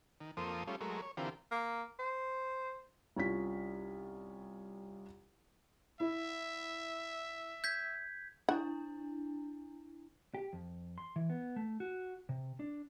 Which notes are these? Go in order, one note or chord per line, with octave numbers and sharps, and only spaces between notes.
D#3
F2 F3 A#3 A4 C5 D#6
G3 A3 C#4 F4
F#3 G#3 A3 A#4
C#5
D3 E3 C4 F4 G4 A#4
A#3
C5
C2 C#4 F4 B6
E4 E5
G6 G#6 B6
D4 E4 F#5
G4
F2
C6
E3
B3
A3
F#4
C3
D4